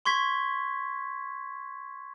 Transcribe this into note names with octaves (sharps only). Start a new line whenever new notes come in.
C6 C#6 G#6 B6